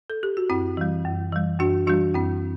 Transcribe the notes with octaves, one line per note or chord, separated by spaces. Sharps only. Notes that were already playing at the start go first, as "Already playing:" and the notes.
A4
G4
F#4
F#2 C4 E4
E3 G3
F#2
E3 G3
F#2 D4 F#4
E3 G3 D4 F#4
F#2 C4 E4